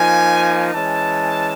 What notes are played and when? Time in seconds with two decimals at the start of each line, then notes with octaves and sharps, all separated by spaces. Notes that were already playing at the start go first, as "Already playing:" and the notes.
Already playing: F3 A#3 D#4 G#5
0.74 E3 G#3 C#4 A5